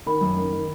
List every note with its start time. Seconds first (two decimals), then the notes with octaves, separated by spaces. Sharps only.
0.07 D#3 B5
0.21 F#2
0.37 D#3
0.53 D#3